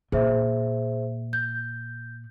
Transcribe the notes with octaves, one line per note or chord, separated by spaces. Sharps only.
A#2 G#4 C5 E5
G6